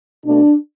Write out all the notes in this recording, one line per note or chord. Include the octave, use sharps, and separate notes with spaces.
B2 A3 D4